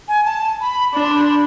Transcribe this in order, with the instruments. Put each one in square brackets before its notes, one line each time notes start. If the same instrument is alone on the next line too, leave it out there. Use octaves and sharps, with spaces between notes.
[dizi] G#5
A5
B5
[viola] D4 [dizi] B5
[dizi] C6
B5
C6
B5